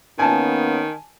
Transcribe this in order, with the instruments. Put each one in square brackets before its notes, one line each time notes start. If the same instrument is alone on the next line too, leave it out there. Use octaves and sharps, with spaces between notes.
[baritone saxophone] D#3 [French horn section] A#3 B3 C#4 [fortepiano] G#5 A5